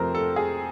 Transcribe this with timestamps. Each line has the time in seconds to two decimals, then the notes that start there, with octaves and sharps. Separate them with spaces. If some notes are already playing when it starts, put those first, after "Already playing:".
Already playing: F2 C3 F3 A3 C4 A#4 C5
0.15 A4
0.36 G#4